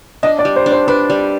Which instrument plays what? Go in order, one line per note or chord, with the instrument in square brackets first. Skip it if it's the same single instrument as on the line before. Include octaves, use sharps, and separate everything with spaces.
[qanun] D4 [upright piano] D#5
[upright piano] D5
[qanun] G3
[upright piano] C5
[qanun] D4
[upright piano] C5
[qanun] D4 [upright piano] B4
[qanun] G3